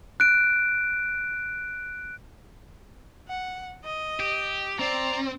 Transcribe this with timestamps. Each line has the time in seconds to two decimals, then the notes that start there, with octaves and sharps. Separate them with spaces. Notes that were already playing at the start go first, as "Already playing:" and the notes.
0.20 F#6 D7
3.29 F#5
3.85 D#5
4.20 G4
4.80 C4 D5 A#5